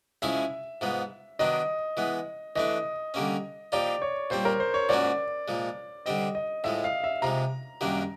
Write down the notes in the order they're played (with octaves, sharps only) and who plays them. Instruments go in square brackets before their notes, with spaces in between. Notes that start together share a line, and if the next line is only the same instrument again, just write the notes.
[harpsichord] F3 G#3 C#4 E4 G#4 [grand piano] E5
[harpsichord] G#2 F3 G#3 B3
[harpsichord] D#3 F#3 B3 D4 [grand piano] D#5
[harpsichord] E3 G#3 B3
[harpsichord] E3 A3 D4 [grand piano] D#5
[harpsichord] D3 G3 A#3 C#4
[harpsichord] F3 A#3 D#4 G4 [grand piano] D5
[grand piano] C#5
[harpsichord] A#2 G3 C4 [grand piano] C5
[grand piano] A#4
C5
C#5
[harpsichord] G#2 F3 A#3 C#4 F#4 [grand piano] D5
[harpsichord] A#2 F3 G#3
[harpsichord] D3 G3 C4 [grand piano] D#5
[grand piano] D#5
[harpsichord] A2 F3 G#3 [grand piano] E5
[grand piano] F5
E5
[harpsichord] C3 F3 G#3 [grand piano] A#5
[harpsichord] F#2 D#3 G3 A#3 D4